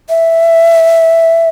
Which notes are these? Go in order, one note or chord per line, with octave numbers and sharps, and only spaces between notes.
E5